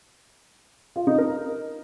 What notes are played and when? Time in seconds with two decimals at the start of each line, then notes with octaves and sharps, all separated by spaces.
0.96 F4
1.07 D#4
1.18 A#4